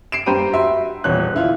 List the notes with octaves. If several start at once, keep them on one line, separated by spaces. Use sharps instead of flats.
C7 D7 E7
G2 G4 C5 A#5 B5 D#7
F#4 E5 C6
D#1 E2 C#5 F#6
D3 E4 F4